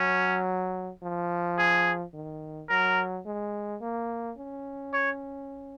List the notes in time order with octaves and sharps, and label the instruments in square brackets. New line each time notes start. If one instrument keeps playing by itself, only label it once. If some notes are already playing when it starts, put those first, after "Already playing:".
Already playing: [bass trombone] F#3 [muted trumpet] C#4
[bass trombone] F3
[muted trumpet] G#4
[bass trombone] D#3
[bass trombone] F#3 [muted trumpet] A#4
[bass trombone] G#3
A#3
C#4
[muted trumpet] C#5